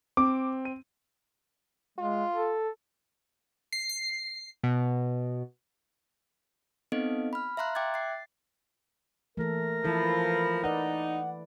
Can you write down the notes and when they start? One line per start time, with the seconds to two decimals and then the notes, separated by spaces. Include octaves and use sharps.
0.17 C4 D6
0.65 D#7
1.98 G#3 F4
2.35 A4
3.73 C7
3.89 C7
4.64 B2
6.92 B3 C4 D#4 A4 D#5 F5
7.33 B5 F6
7.57 E5 F5 A#5 C6 F#6
7.75 E5 G5 D6 F#6 G#6 A6
7.94 A6 C7
9.37 E3 A3 A#3 A4 A#4
9.84 E3 F3 E4 A4 B5
10.64 D#4 B4 D5 F#5